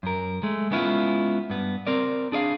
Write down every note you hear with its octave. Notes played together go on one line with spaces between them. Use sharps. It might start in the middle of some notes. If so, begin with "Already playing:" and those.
F#2 A#4
G#3 A3
G#3 B3 C#4 E4 F4
G2 B3
C4 A#4 D5
D4 G#4 D5 F5